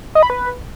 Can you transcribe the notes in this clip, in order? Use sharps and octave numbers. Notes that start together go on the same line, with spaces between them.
D#5
B5
B4